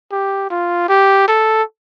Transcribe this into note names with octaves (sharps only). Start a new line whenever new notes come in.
G4
F4
G4
A4